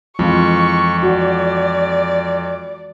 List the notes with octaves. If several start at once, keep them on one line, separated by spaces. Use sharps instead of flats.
F2 E3 G#3 F4 C#6
F#4 D5